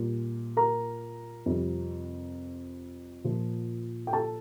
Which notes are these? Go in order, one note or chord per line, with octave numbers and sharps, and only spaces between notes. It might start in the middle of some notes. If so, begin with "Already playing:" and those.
Already playing: A#2 G3
A#4 A#5
F2 C3 G3
A#2 F3
G5
A4 A5